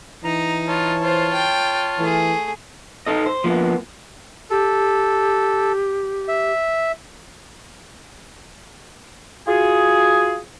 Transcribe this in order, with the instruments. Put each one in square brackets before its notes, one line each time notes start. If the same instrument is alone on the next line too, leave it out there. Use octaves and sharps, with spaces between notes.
[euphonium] E3 [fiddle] D#4 [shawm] A#5
[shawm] F4 [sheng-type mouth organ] C#5 A5
[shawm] F4 [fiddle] C5
[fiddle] G5
[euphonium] E3 [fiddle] A3 G#4
[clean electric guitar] D#4 A4 D#5
C5
F3 A#3 B3
[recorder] G4 [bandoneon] A4
[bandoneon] E5
[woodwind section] F4 F#4 G#4